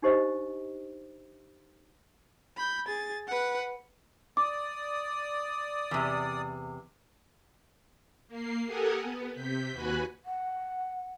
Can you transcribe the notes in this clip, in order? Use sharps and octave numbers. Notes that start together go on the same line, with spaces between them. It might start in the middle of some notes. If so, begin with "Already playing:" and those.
D4 D#4 G4 C5 D#5
B5 G6
G#4 A6
B4 F#5
D5 D6 D#6
E2 C3
A#3 C7
G4 A4 A#4 F#5 G#5 D#6
B3
C3 G6 B6
D#2 F#4 B4 G#5 B5 F#6
F#5